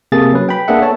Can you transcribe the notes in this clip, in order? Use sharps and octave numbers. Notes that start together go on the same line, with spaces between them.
C3 A#3 G#4 A4 A6
F#3 C#4 B4
G5 B5
A#3 B3 D4 G#4 E5 F#5
A4 C#5 A5